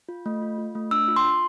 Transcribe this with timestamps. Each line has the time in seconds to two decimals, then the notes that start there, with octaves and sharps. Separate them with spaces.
0.09 F4
0.26 A3
0.42 F4
0.58 F4
0.75 A3
0.91 D4 E6
1.08 F4
1.16 C6
1.25 F4